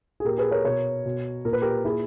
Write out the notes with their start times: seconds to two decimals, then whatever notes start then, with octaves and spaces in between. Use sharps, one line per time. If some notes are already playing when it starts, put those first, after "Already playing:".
0.20 G#4
0.24 A#2 G4 A#4
0.38 G#4 B4
0.51 A#4 C#5
0.64 B2 A#4 C#5
1.05 B2
1.45 A#2 A#4
1.53 B4
1.62 G4 A#4
1.85 A#2 E4 G#4